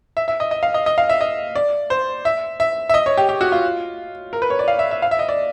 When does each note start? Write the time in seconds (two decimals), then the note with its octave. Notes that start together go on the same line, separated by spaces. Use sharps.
0.17 E5
0.28 E5
0.40 D#5
0.51 D#5
0.63 F5
0.74 D#5
0.86 D#5
0.98 F5
1.09 E5
1.21 D#5
1.55 D5
1.90 C5
2.25 E5
2.60 E5
2.89 E5
2.94 D#5
3.06 C#5
3.17 G4
3.29 G4
3.41 F#4
3.52 F4
4.33 A#4
4.42 B4
4.50 C#5
4.59 D5
4.68 F5
4.79 E5
4.91 E5
5.02 F5
5.11 E5
5.19 D#5
5.29 D5